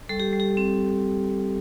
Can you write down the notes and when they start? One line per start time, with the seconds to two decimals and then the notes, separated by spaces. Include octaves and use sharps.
0.09 G3 A4
0.20 G4
0.33 G3
0.40 G4
0.57 C4